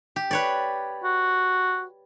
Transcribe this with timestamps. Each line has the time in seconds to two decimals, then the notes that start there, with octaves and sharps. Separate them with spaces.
0.16 G4
0.31 B4 C#5 D5
1.04 F#4